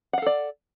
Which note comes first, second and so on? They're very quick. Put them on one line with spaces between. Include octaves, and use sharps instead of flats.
F#5 F5 A4 D5